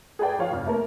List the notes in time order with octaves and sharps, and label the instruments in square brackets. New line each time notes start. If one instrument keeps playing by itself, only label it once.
[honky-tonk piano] G#4 A4 B4 D5 G5
F3 C#5 F5 C#6
F1 F2 F6
A3 A#3 A#4